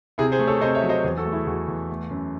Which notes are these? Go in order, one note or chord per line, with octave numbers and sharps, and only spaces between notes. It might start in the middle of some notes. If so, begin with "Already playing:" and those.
C3 E4 G#4
G#4 C5
A3
A4 C#5
C3 C5 D#5
C#5 E5
F#3
C5 D#5
E2 G#4 C5
F#4 A4
A3
E4 G#4
E2 F#4
E2
A3
F#2